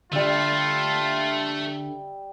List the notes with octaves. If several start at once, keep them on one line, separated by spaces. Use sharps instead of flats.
D3 G3 A3 F4 E5